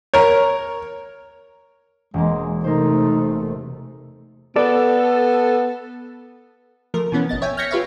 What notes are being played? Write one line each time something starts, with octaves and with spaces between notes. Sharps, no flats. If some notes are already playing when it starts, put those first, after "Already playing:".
A#4 C#5
E1 G#3 A#3
C3 A3 D#4 A#4 C5
B3 A4 D5
F3 A3 A#4
B2 E3 B3 C#4
G1 D#5 A6
C#5 E5 G5 G#5
F6 G6 G#6 A#6 B6 C#7
F4 G4 B4 C#5 E5 F5